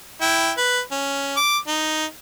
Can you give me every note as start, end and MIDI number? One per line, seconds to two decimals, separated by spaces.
0.21 0.52 64
0.21 0.52 79
0.57 0.79 71
0.92 1.36 61
1.36 1.57 86
1.67 2.05 63